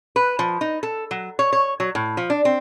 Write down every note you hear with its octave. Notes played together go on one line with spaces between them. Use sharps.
B4
F3
D#4
A4
F#3
C#5
C#5
F#3
A2
F3
D4
C4